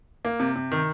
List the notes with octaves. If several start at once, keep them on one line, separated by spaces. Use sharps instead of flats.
A#3
C3
C3
D#3